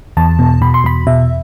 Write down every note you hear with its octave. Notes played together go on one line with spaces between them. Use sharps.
E2 A5
B2
B2 B5
C6
E2 B5
B2 E5